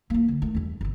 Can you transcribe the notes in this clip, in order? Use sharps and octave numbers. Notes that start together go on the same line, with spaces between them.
A#3 F4
D3
D#3 A3
E2 G2
G1 C3